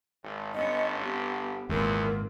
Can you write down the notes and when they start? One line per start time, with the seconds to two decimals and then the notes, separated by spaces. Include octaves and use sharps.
0.23 G#1
0.54 G1 B3 C#4 D#5
1.02 B3 C4 G4
1.69 G#1 E2 A#2 C4 A#4